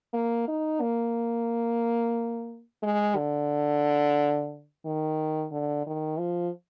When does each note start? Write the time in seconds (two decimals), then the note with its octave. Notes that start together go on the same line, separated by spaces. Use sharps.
0.13 A#3
0.48 D#4
0.81 A#3
2.83 G#3
3.16 D3
4.85 D#3
5.52 D3
5.87 D#3
6.19 F3